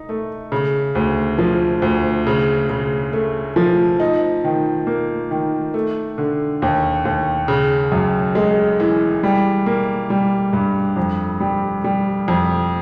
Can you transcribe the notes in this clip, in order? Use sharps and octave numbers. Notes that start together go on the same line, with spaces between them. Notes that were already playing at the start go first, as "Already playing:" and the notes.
Already playing: D#4
A3
C#3
D2
F3
D2
C#3
C#3
A3
F3
D#4
D#3
A#3
D#3
A3
D3
D#2
D#2
C#3
F#2
G#3
E3
G3
A#3
G3
G2
F2
G3
G3
F2